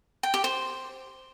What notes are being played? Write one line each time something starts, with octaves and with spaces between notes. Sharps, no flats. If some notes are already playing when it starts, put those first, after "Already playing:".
G5
G4
C5